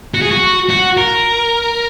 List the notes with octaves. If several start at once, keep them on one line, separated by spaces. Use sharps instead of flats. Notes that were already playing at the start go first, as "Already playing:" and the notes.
F#4
G#4
F#4
F#4
A#4